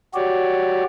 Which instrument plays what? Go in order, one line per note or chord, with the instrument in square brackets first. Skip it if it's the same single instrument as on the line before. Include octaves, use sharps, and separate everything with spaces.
[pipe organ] F#4 G4 C#5 D5